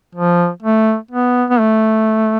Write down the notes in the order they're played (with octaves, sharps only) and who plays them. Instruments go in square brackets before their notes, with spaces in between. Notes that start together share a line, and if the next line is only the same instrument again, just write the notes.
[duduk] F3
A3
B3
B3
A3